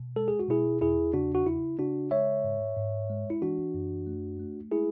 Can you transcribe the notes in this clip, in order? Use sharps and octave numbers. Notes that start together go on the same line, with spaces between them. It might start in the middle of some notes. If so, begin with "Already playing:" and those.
Already playing: B2
G#3 A4
G#4
F#4
B2 E4 G#4
E2 E4 G#4
C#3 D4 F#4
F#4
C#3 E4
C#3 D4 F#4
G#3 C#5 E5
G#2
G#2
G#3
E4
E3 D4 F#4
F#2
A3
A3
G#3 E4 G#4